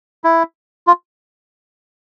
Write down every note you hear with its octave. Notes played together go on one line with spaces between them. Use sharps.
E4
F4